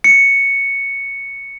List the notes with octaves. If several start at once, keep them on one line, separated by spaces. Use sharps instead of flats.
C#7